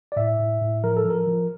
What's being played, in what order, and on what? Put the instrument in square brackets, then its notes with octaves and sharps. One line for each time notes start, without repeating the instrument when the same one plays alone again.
[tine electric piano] D5
A2 E5
A2
A2
F3 A#4
A4
F3
A#4
F3